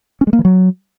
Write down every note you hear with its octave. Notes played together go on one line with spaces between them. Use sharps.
C#4
G#3
A#3
E3
F#3